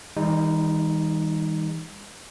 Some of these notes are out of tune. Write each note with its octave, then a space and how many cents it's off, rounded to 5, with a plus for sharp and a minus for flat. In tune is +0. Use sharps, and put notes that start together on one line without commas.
E3 -45 G3 +45 D#4 +0